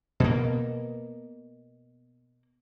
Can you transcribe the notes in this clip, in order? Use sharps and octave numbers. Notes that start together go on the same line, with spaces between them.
B2 A#3